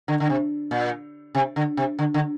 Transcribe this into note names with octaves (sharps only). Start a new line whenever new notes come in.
D3
D3
C3
A#2
C3
D3
C3
D3
D3